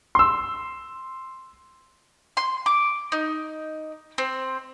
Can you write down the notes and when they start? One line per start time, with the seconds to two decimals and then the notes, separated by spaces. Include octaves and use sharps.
0.15 C6 E6
2.37 C6
2.66 D6
3.12 D#4
4.18 C4